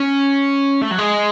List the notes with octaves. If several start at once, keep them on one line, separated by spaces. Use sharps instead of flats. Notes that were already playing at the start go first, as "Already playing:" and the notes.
Already playing: C#4
A3
F#3
G#3